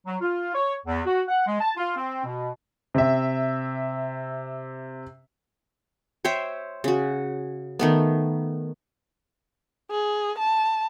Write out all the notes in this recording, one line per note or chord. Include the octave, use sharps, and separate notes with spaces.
F#3
F4
C#5
E2
F#4
F#5
G#3
A5
F4
C4
B2
C3 E5
C5 C#5 E5 G5
C#3 F#4
D#3 A3 B3
G#4
A5